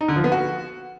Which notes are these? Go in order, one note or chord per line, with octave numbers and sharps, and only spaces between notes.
D#4
D3
F3
B3
F#4